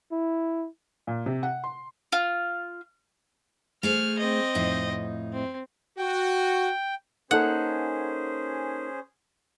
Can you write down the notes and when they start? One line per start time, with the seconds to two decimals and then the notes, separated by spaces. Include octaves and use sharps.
0.12 E4
1.07 A#2
1.26 C3
1.43 F#5
1.64 C6
2.12 F4
3.83 A3 G#4 C5 F6
4.18 C4 D#5
4.55 F2 A2 D#4
5.33 C4
5.98 F#4 G5
7.31 A#3 C#4 D#4 G#4 A4 C5 F#5